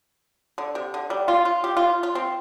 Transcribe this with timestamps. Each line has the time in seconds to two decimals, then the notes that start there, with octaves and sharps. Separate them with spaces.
0.58 D3
0.75 C3
0.94 D3
1.10 G3
1.28 F4
1.45 F4
1.64 G4
1.77 F4
2.03 F4
2.15 C4